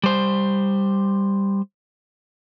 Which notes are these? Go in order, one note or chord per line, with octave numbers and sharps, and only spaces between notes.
G3 C5